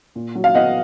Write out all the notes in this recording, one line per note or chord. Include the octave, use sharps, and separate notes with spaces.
A#2
F#3
F5
B3 D#5 F#5